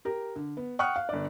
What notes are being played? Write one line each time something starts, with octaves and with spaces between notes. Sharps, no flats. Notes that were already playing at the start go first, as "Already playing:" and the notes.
G4 A#4
D3
B3
F#5 G5 C#6 D#6 F6 F#6
F5
G1 D5